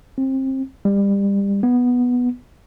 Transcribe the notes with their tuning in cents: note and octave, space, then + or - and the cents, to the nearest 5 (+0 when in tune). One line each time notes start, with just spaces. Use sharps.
C4 +25
G3 +25
B3 -5